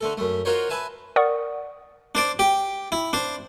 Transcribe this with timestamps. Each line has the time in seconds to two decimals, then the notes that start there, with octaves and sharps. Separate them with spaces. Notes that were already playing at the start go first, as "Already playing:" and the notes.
0.01 D3 A3 A4
0.17 F#2 A3
0.45 D#4 F4 F#4 A#4 C5 C#5
0.69 B4 E5 G#5 A5
1.16 A#4 D5 F#5 C#6 D#6
2.15 D4 C5 D5
2.39 G4
2.92 E4
3.13 D4 C5